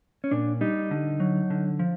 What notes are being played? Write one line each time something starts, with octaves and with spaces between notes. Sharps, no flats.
C#4
A#2 D4
G3 D#4
D3
F#3
D3
F3